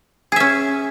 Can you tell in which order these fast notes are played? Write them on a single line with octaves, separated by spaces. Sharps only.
G#4 E5 C#4